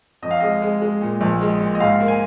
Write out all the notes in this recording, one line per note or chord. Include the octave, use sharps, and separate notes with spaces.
F2 D#5
F5
G#3 D#5
G#3
G#3
A#2
A#1
G#3
A#2
D#5
G#2 F5
A#3
G#5